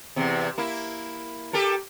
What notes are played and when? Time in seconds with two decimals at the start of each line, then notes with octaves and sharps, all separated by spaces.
0.16 E2 C3
0.58 A#3 E4
1.53 G4 A4 A#4